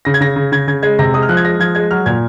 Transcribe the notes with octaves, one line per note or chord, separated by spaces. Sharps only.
C#3 A#6
G#6
C#3 A#6
C#3
C#3 G#6
C#3 G#6
G#3 G#6
C3 A#6
G#3 D#6
F6
F3 F#6
G#6
G#3 A#6
F3 G#6
G#3 G#6
F#3 F6
A#2 G#6